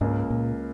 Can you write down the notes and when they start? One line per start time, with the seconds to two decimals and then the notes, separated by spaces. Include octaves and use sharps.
0.01 C#2 G#2 C#3 A#3
0.30 A#2